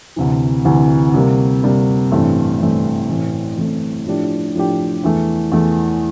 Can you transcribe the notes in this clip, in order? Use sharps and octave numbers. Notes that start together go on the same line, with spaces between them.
D2 C3 E3
D2 C3 E3
C3 G3 A#3
C3 G3 A#3
A1 G2 E3 A3 C4
A1 G2 E3 A3 C4
A1 A2 E3 A3 C4
A1 A2 E3 A3 C4
A2 F3 A3 D4 G4
A2 F3 A3 D4 G4
E2 E3 A3
E2 E3 A3